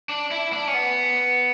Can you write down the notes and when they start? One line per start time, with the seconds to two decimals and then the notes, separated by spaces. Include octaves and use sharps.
0.09 D4
0.31 E4
0.53 D4
0.68 C#4
0.74 B3